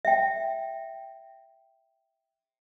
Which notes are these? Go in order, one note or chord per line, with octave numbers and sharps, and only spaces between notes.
E5 G5